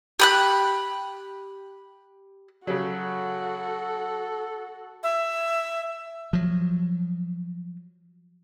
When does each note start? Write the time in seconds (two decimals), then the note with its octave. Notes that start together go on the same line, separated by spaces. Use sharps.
0.20 G4 B5 F#6
2.67 C#3 F#3 F#4 A4
5.03 E5
6.33 F3 F#3